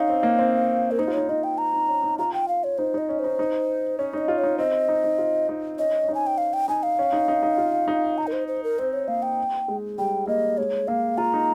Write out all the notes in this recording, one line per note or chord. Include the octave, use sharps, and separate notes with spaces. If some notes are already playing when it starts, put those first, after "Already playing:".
Already playing: C#4 D#4 F5
C4
A#3
C4
A#4
D#4 C5
F4
D#4 C#5
D#4 D#5
G5
A#5
D#4
C#4
D#4
F4 A#5
G5
F5
C#5
D#4 C5
D#4 D#5
C#4
C5
D#4
D#4
C#4 C#5
D#4 D#5
F4
C#5
D#4
C4 D#5
D#4
D#4
F4
D#4
C#4 D#5
C#4
D#4
G#5
G5
F5
G5
D#4 G#5
F5
C#4
D#4
D#4
D#4
F4
D#4
A#5
A#4
C5
C5
A#4
C4 C5
C#5
A#3 F5
G5
G#3
G3 G5
A#3 D#5
G#3 C#5
A#3 F5
F4 A#5
D#4